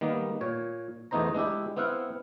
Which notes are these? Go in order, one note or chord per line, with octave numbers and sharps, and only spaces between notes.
D#3 G3 A#3 B3
A#2 C#5
E2 A3 B3 D#4 C5 A#5
G#3 D4 E4 G4
B3 C4 E4 F5 F#5